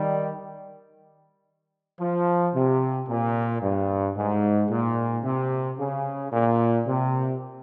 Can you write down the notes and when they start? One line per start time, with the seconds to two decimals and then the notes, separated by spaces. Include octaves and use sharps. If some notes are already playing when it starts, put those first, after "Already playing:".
Already playing: D#3 G3
2.00 F3
2.54 C3
3.08 A#2
3.62 G2
4.16 G#2
4.70 A#2
5.24 C3
5.78 C#3
6.32 A#2
6.87 C3